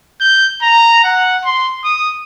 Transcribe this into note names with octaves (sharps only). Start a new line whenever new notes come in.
G6
A#5
F#5
C6
D#6